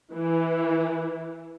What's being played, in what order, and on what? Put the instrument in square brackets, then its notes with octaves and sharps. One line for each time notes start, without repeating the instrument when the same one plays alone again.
[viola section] E3